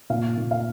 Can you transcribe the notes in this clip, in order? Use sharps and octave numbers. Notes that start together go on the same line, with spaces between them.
A#2 F5
A#2
F5